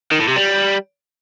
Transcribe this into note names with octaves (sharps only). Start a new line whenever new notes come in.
D#3
A2
C3
G3